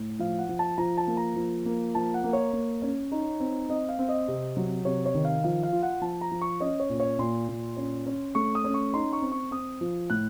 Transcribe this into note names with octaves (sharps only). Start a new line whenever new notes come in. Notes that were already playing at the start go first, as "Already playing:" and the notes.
Already playing: A2
F3 F5
F#5
F3
A5
F3 A#5
A5
A#3
A#5
F3
A#3
F3 A5
F#5
A#3
C#5
A#3
C#4
D#4
C4
C4 D#5
F5
C4
D#5
C3
F#3
C3 C#5
C#5
D#3
F5
F3 F5
F5
F4
F#5
F3 A5
A#5
F3
C#6
C#4 D#5
C#5
A#2
C#5
A#2 C6
A#2
C#4
C#4
A3 C#6
D#6
C#4
C#6
D#4 C6
C#6
C4
C#6
C4 D#6
F3
A2 F#6